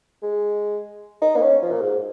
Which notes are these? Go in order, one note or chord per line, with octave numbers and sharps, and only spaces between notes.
G#3
D#4
A#3
C#4
F3
A#2
G#2